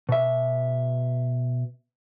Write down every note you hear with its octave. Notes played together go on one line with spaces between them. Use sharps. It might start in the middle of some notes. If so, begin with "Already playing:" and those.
B2 E5